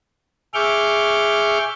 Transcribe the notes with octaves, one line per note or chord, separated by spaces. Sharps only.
G#4 E5 C#6 D6 F6 G6